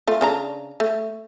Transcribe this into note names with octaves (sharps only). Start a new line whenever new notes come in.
A3 F4
C#3 D4 A#5
A3